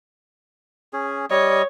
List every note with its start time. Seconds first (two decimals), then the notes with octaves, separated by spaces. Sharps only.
0.93 C#4 G#4
1.31 G3 C#5 D#5